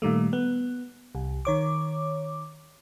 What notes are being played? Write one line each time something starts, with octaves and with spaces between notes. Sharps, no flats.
A#2 D#3 G3 A3
B3
C2
D#3 C#5 D6